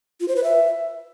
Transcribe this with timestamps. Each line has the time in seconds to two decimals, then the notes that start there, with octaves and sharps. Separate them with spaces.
0.21 F4
0.28 C5
0.36 B4
0.44 E5